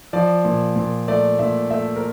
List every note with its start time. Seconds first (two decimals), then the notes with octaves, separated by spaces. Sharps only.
0.13 F3 D5
0.45 A#2
0.76 A#2
1.08 A3 D5
1.39 A#2 E5
1.70 A3 E5
1.96 A#4